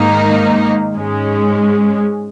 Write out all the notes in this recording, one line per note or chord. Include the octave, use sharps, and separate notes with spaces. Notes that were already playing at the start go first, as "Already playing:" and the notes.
Already playing: G#2 D#3 A#3 D#4
G#2 G#3 C#4